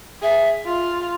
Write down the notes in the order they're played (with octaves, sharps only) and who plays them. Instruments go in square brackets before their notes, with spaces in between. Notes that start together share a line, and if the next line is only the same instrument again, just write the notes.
[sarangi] G#4 [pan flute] E5
[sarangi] F4